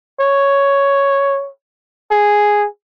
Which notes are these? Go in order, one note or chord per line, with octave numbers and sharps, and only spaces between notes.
C#5
G#4